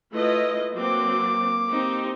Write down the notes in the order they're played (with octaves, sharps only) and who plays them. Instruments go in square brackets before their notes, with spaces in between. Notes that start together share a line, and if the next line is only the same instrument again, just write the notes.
[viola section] A3 F4 D#5 [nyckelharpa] E4 B4
[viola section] F#3 C4 [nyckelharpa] A#3 D6
[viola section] C4 D#4 G4